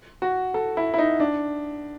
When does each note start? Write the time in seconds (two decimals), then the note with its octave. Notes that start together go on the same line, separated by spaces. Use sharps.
0.22 F#4
0.54 A4
0.77 E4
0.94 E4
0.98 D#4
1.20 D4